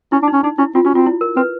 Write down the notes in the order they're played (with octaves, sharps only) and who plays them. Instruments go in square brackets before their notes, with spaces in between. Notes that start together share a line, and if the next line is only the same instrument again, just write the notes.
[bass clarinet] C#4 [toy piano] E4
[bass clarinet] D4
[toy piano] D#4
[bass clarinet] C#4
[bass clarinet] D4 [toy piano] D#4
[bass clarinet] C#4 [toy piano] E4
[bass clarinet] C4 [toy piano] F4
[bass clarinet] C#4 [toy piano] F#4
[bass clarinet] C4 [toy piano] F4
[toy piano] E4
A#4
[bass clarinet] C4 [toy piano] B4